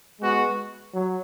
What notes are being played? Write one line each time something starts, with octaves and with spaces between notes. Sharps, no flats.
G#3 B3 F#4
F#3